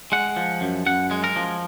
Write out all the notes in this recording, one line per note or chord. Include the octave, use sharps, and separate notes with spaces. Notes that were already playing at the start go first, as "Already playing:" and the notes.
G#3 F#5
F3
F#2
F#2 F#5
G#3
A#4
F3